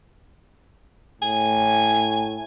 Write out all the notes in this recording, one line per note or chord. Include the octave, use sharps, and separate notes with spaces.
A2 G#5